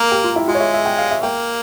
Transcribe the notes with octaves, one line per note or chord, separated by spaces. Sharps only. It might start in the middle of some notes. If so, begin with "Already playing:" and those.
Already playing: A#3 A#4
G4
F4
E4
G#3 F4
C#5
E5
E5
G5
F5
E5
A#3 G5